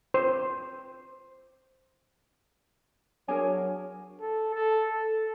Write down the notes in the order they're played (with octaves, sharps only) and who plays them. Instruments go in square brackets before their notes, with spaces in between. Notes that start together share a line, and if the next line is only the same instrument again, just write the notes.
[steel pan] C5
[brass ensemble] F#3 F#4 C#5 [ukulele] D4 G#4 A#4 [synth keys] G#5
[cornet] A4
A4
A4